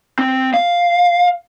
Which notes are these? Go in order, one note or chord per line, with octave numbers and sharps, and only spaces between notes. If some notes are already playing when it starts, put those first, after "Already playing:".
C4
F5